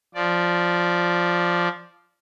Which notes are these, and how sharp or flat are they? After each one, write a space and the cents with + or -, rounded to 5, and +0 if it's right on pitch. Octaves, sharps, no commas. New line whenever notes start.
F3 +0 D5 +0